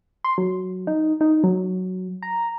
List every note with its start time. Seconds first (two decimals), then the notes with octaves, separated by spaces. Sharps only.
0.24 C6
0.38 F#3
0.87 D#4
1.21 D#4
1.44 F#3
2.23 A#5